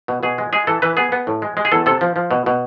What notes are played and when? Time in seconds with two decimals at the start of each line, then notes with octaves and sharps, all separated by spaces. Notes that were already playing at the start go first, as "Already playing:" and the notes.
0.08 B2
0.23 B2 G#4
0.38 G#3
0.53 G#3 G#4
0.67 E3 A4
0.82 E3 B4
0.97 B3 G#4
1.12 B3
1.27 A2
1.42 G#3
1.57 G#3
1.65 G#4
1.72 E2 A4
1.86 C3 A4
2.01 F3
2.16 F3
2.31 B2
2.46 B2